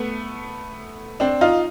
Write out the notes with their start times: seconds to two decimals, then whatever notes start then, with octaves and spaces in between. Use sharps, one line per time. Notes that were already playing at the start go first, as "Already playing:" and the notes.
Already playing: A3 B3
1.20 C4 D4
1.41 D#4 F4